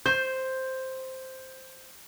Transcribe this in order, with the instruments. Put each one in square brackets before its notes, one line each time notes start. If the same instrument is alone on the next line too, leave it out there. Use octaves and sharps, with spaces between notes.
[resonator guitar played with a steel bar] C5 [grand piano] G6